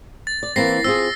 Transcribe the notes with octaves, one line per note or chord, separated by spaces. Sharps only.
A6
D5
E3 A#3 C4 A#6 C7
C4 F4 G#4 E6